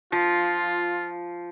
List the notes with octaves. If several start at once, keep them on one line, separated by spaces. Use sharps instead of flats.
F3 F4